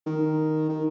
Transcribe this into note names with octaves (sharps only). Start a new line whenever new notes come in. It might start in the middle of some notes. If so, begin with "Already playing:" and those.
D#3
D#3